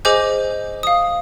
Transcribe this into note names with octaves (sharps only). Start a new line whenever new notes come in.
G#4 C5 D#5 G#5 D6 G6
F5 D#6